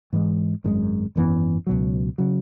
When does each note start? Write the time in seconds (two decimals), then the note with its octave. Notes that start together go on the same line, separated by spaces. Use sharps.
0.13 G#2 E3 G#3
0.64 G#1 F#2 D#3 G#3
1.16 G#1 F#2 E3 B3
1.67 C#2 B2 F#3
2.18 C#3 F#3